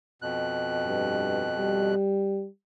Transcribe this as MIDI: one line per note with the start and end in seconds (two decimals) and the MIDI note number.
0.22 1.95 41
0.22 1.95 47
0.22 1.95 90
0.86 1.46 43
1.58 2.47 55